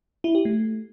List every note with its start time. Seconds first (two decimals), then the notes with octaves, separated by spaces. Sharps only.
0.24 E4
0.35 G4
0.45 A3